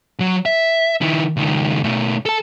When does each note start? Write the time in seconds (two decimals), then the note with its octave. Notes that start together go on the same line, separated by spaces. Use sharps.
0.20 F#3
0.46 E5
1.01 D#3 E4
1.37 C#2 D#3
1.84 B2 A3
2.26 A4 A5